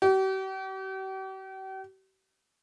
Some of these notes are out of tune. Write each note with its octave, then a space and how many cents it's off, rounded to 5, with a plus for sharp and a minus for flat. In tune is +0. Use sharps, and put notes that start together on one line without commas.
G4 -45